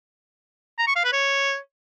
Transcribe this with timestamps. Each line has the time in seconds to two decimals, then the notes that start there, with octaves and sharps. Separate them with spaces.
0.78 A#5
0.87 C#6
0.96 F5
1.04 B4
1.13 C#5